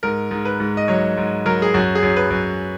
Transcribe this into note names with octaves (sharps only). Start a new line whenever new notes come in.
G#2 A#4
G#2
B4
G#2
D#5
F#3 C#5
G#2
F#3 A#4
G#4
F#2 F#4
G#4
F#2
B4
F#2